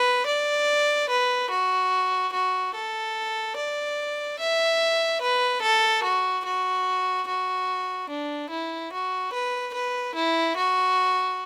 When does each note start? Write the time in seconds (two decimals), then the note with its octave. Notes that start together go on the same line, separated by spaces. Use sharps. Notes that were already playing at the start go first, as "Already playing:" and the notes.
Already playing: B4
0.27 D5
1.10 B4
1.51 F#4
2.33 F#4
2.74 A4
3.57 D5
4.40 E5
5.22 B4
5.62 A4
6.04 F#4
6.45 F#4
7.28 F#4
8.10 D4
8.50 E4
8.93 F#4
9.33 B4
9.74 B4
10.15 E4
10.57 F#4